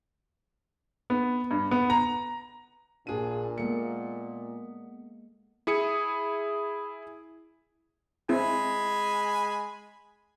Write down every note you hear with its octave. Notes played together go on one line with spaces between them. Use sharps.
B3
G2
B3
A#5
A#1 A#2 D4 G#4 D#7
G#3 A#3 B3 A4 C#7
E4 G#4 D#6 C#7
G#3 C4 E4 G#4 G#5 B5